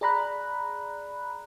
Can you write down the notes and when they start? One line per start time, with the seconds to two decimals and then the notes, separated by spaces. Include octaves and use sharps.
0.01 G#4 D5 A#5 B5 F#6